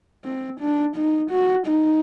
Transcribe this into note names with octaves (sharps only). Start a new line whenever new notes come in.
C4
D4
D#4
F#4
D#4